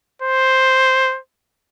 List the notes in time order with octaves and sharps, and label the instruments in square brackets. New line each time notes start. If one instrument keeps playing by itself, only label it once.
[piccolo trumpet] C5